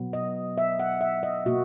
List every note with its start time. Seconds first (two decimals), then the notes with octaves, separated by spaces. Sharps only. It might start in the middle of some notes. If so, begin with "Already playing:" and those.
Already playing: B2 F#3 B3
0.13 D#5
0.58 E5
0.79 F#5
1.01 E5
1.23 D#5
1.46 B2 A#3 F#4